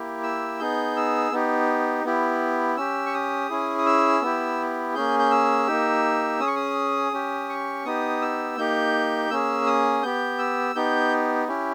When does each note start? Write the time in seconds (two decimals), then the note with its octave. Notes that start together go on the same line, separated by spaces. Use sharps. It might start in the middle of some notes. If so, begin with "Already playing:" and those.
Already playing: A#3 E4 G4
0.23 E6
0.59 B3 D#4 G#4 G6
0.96 E6
1.32 B3 D#4 G4
2.04 B3 E4 G4
2.77 C#4 G4 E6
3.06 C#6
3.14 D#6
3.50 C#4 E4 G#4
3.78 D#6
3.86 E6
4.22 B3 E4 G4
4.94 A#3 C#4 G#4 G6
5.19 G6
5.31 E6
5.67 A#3 D#4 G4
6.40 C#4 G#4 D#6
6.47 C#6
6.56 D#6
7.13 C#4 G4
7.49 C#6
7.85 B3 D#4 G4 D#6
8.22 E6
8.57 A#3 D#4 G4 G6
9.30 A#3 C#4 G#4 E6
9.66 D#6
10.03 B3 G4 G6
10.39 E6
10.75 B3 D#4 G4 G6
11.48 C#4 E4 G4